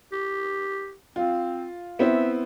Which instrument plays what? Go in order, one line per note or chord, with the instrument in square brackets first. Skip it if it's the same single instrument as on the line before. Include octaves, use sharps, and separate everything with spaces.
[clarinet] G4
[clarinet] C4 [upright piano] F4
[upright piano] B3 C4 E4 [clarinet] E5